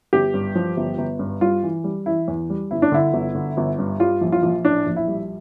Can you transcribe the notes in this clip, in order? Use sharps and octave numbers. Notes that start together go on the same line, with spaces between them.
G1 G4
G2
F3
G1
G1
G2
G3 F4
E3
G3
E3 E4
E2
G3
G1 E4
D4
D3 E4
G1
D3
G1
G2
G3 F4
A#1
F4
A#1
A2 D4
A#1
E4
G3